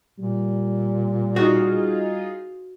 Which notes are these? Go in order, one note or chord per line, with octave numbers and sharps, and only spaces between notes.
A#2 G3
D#4 F4 F#4 G#4